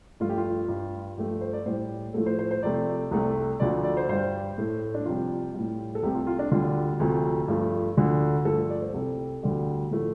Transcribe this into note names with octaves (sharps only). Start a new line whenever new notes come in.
G2 F3 A3 F4
G4
F4
G2 G3
G2 F3 A3 G4
C5
D5
A2 G3 C5
A2 F3 A3 A4
C5
C5
C5
F2 C3 A3 D5
C2 C3 A3
D2 D3 F3 A3 D5
D5
C5
G2 G3 C5
A2 A3
D4
F2 C3 G3 F4
A2 G3
A4
C2 C3 A3 G4
F4
F4
D4
D2 D3 G3 F4
D2 C3 F3 A3
G2 F3 A3
D2 D3 F3 A3
G2 F3 A3 A4
D5
C5
C2 C3 G3 A4
D2 D3 G3
A2 F3 A3